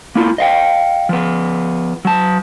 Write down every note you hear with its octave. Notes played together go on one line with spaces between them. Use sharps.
A#3 E4 F4
D#5 F5 G5
F3 B3
F#3 A5